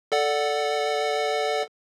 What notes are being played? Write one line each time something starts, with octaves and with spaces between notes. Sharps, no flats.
A4 D5 F#5